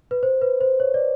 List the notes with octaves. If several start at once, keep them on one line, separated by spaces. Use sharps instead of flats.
B4
C5
B4
C5
C#5
D5